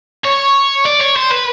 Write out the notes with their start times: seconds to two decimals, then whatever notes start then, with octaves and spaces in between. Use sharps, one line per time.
0.24 C#5
0.86 D5
1.01 C#5
1.16 C5
1.31 B4